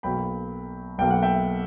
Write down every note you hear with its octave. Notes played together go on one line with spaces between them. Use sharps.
B1 B2 F#3 A#3 G5 B5
B1 B2 F#3 A#3 G5
F#5
E5 G5